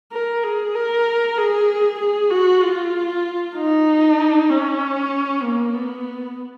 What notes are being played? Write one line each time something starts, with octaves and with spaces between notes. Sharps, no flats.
A#4
G#4
A#4
G#4
G#4
F#4
F4
D#4
C#4
A#3
B3